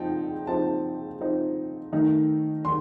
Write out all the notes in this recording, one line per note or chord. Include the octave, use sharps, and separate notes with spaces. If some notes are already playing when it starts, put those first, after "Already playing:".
Already playing: F3 C4 D#4 G5 A5
F3 C4 D#4 A5
F3 C4 D#4
D#3 A3 D#4
D#3 C6